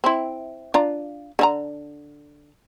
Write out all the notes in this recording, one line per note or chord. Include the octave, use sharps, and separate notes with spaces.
C4 E4
D4 F4 A#5
D3 E4 A#5